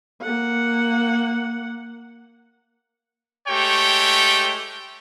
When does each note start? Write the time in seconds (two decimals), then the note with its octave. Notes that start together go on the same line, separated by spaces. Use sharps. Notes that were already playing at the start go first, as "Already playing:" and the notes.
0.22 A#3 F#5
3.48 G#3 A3 G4 C#5 G5